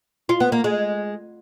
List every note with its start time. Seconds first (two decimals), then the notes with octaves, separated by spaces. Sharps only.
0.29 F4
0.40 B3
0.52 A#3
0.64 G#3